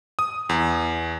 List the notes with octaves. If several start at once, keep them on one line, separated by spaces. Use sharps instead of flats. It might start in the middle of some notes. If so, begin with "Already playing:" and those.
D#6
E2